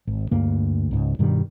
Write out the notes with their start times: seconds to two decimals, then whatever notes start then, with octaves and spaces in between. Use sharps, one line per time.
0.07 G#1
0.31 D2 G2 A#3
0.91 C#2 G#2
1.19 G2 B2 D#3 G3